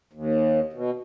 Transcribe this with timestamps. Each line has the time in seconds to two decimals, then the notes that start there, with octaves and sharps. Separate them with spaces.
0.13 D#2
0.73 B2